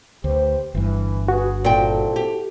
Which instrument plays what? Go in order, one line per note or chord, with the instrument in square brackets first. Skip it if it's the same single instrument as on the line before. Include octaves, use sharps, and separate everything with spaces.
[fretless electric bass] D2 [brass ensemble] G4 B4 C5
[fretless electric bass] G1 G2 [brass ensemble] E3
[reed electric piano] F#4 [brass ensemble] G#4 B4
[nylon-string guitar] A#2 G5 [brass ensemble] C4 E4 A4
[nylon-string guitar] G4